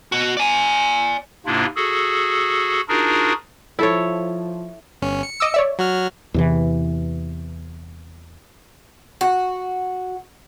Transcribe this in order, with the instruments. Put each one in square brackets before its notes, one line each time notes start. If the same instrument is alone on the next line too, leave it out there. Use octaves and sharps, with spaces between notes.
[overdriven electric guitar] B2 F#4
D5 G#5
[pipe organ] G#2 C3 A#3 D4 E4 F4
F#4 G#4 A4
D4 D#4 F4 F#4 G#4 A#4
[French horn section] F3 [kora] E4 A4 C#5
[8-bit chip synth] G1 C#4
C#7
[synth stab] D#5 D6 E6
C#5 D5 E5
[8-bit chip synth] F#3 F#4 F6
[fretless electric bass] E2 C3 E3
[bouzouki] F#4